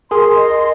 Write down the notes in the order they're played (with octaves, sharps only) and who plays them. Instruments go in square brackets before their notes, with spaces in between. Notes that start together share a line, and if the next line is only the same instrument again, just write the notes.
[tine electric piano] G#4 A#4 [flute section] C6
[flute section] D#5